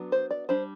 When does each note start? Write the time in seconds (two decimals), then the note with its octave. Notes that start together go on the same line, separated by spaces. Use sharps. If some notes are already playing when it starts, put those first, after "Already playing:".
Already playing: F#3 B3 D4
0.12 C5
0.31 D5
0.49 G3 D4 C5